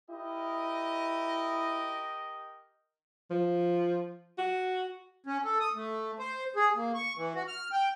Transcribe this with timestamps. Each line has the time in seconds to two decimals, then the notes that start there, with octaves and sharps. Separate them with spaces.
0.10 E4 G4 A#4 D#5
3.30 F3
4.38 F#4
5.26 C#4
5.44 A4
5.60 D#6
5.75 A3
6.19 C5
6.56 G#4
6.76 A#3
6.95 C#6
7.17 E3
7.35 F#4
7.48 F6
7.72 G5